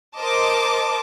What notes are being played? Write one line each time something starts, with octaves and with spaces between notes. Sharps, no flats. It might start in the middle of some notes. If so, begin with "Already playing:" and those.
A#4 C5 D#5 A5 D6